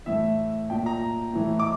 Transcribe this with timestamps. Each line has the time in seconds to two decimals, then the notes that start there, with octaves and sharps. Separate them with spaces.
0.06 A2 E3 E5
0.70 A#2 G5
0.86 A#5
1.33 A2 E3
1.59 D6